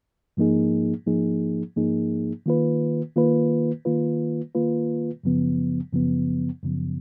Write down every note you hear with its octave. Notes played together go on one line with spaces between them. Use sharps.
G#2 F3 A#3 D#4 G#4
G#2 F3 A#3 D#4 G#4
G#2 F3 A#3 D#4 G#4
D#3 A#3 F4 B4
D#3 A#3 F4 B4
D#3 A#3 F4 B4
D#3 A#3 F4 B4
F#2 C#3 F3 B3
F#2 C#3 F3 B3
F#2 C#3 F3 B3